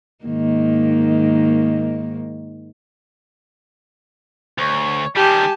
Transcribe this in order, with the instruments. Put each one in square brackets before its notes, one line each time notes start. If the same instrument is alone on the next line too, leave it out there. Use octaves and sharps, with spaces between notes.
[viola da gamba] G#2 D#3 A#3
[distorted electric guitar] D2 [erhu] C#5
[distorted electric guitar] D#3 G3 [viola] G4 G#5 [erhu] A5